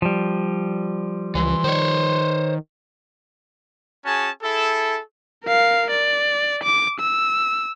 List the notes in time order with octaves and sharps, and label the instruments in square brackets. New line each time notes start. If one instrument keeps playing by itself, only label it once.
[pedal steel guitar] F3 G3
[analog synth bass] C#2 [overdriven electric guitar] E3 [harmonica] C6
[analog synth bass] D#3 [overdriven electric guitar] C5 C#5
[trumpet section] C#4 F#4 G#4 G#5 A5
E4 G#4 A4
[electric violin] A#4 F5
D5
D6
E6